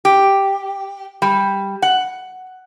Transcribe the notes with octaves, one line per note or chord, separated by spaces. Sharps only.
G4
G3
F#5